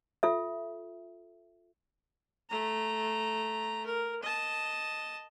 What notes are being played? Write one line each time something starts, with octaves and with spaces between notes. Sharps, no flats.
F4 A4 E5
A3 A#5
A#4
D#5 A5